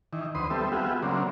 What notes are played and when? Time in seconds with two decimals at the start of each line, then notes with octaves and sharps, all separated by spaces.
0.13 D#3 E3
0.35 D2 B4 C5 C6 D#6
0.50 G3 B3 C4 A4 E5
0.72 G3 B3 F4 F#4 G#4 E5
1.03 C#3 F#3 A#3 C4 D4